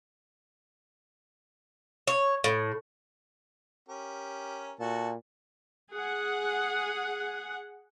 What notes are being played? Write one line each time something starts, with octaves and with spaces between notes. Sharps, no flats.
C#5
A2
C#4 G4 A#4
A#2 F#4 A4 A5
G#4 F#5